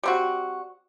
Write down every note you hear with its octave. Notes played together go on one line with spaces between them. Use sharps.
G3 C4 F#4